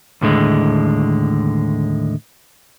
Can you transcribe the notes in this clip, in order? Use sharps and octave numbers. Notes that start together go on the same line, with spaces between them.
D#2 A2 D3 G#3